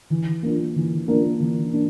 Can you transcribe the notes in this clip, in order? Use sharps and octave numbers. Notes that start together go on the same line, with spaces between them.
E3
A#3 D4 F4
E3
A#3 D4 F4
E3
A#3 D4